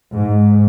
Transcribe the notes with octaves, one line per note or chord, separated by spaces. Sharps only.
G#2